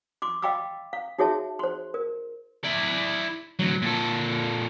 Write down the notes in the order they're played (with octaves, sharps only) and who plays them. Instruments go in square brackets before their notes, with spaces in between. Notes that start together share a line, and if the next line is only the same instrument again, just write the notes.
[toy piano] C6 D6
D#5 F5 G5 B5 D6 E6
F5
D#4 F#4 G#4 C#5 E5 A5
C5 C6
A#4
[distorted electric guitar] E4 D5
D2 F#3
A#2 A4